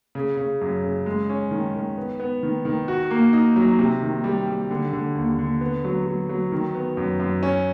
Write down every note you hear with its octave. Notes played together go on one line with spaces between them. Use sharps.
C#3
C#3
F#2
C#3
G#3
C#4
D#3
D#3
B3
B3
D#3
D#3
F#4
A#3
D#4
F#3
C3
D#3
G3
G3
D3
D3
D#2
D3
B3
F#3
F#3
F#3
D#3
B3
F#2
F#2
C#4